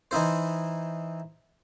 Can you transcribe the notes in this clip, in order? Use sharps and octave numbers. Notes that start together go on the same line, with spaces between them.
E3 D#4 E4 C5